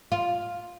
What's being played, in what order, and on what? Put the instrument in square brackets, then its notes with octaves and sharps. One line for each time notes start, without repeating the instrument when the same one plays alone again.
[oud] F4